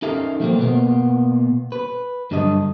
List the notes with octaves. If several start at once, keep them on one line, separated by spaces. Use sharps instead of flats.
C#4 D#4 A4 A#4 E5 F5
F3 F#3 A3 A#3 C4
B2 A#3 B3 F4
B4
G2 D3 F#3 A4 D#5